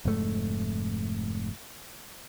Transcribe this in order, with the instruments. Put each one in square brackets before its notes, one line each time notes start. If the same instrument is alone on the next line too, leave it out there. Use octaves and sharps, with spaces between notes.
[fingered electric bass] F1 G#2 A3